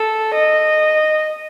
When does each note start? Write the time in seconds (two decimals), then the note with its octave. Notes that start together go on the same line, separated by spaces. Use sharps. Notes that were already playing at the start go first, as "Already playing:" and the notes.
Already playing: A4
0.34 D#5